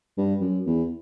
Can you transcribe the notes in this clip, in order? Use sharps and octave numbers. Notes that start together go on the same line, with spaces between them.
G2
F#2
E2